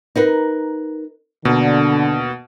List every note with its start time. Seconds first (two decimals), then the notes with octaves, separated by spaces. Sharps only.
0.15 D#4 A#4 B4
1.45 D#2 B2 D3